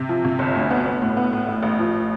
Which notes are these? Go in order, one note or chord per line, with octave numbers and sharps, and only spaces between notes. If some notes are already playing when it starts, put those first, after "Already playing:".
Already playing: C3
F3
C3
G1
D2
B3
B3
A2
B3
A2
A1
A1
F3